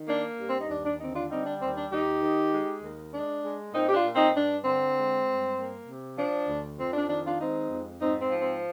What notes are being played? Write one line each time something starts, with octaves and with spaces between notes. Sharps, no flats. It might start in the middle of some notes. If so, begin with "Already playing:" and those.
Already playing: D#3
A#3 D4
G2
C4
D#4
D#2 D4
D4
D3 C4 D#4
D4 F4
G3 C4 D#4
D4
D#2 C4
D4
D#2 D#4 G4
D#3
G#3
D#2
G#3 D4
G#3
A#2 C4 D#4
G4
D4 F4
A#2
C4 D#4
G2 D4
D3 C4
G#3
G2
A#3
C3
F3 D4
D2
F2 C4
D4
D#3 D4
D4 F4
G#3 C4 D#4
F2
G#2 C4 D#4
C4
F3
C4